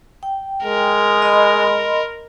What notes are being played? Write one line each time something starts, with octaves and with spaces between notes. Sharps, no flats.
G5
G#3 A#4
D#5 B5 C6